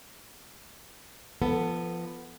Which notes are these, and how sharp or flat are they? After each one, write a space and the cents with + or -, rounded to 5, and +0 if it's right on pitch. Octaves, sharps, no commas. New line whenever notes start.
F3 -20 B3 +0 A4 +15